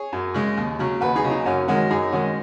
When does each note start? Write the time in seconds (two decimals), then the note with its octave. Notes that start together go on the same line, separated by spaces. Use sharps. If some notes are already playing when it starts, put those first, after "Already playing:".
Already playing: G#4 C#5
0.13 F#2
0.34 C#3 G#3
0.57 D#2
0.79 C#3 F#3
1.01 D#2 F#4 B4
1.16 D#4 G#4
1.24 C#3 F#3
1.31 D#4
1.46 F#2 C#4 F#4
1.68 D#3 G#3 C#4 F#4
1.90 F#2 D#4 G#4
2.12 D#3 G#3 C#4 F#4